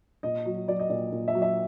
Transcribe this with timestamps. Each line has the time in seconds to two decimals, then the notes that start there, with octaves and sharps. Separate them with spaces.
0.23 A#2 D#5
0.46 F#3
0.68 F#3 D5
0.80 D#5
0.90 A#2 D5
1.12 A#2
1.28 E5
1.35 F#3
1.42 E5